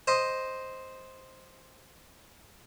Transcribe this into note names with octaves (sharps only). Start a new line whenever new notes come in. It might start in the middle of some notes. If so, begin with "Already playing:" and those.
C5 D#5